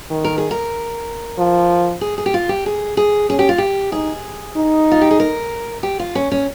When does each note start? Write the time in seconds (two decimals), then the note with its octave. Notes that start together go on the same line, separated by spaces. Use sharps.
0.11 D#3
0.25 A#4
0.38 G#4
0.51 A#4
1.38 F3
2.01 G#4
2.18 G#4
2.26 G4
2.34 F4
2.49 G4
2.66 G#4
2.97 G#4
3.29 C#4 G#4
3.39 G4
3.49 F4
3.58 G4
3.92 D#4 G#4
4.57 D#4
4.91 F4
5.01 G4
5.11 G#4
5.20 A#4
5.83 G4
6.00 F4
6.15 C#4
6.32 C#4